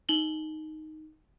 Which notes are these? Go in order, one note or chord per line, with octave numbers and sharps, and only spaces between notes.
D#4 F#7 G7